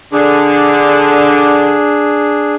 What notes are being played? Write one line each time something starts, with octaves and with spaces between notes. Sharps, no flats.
D3 D4 G#4